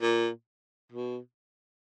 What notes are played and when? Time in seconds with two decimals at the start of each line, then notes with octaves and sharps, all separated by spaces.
0.02 A#2
0.92 B2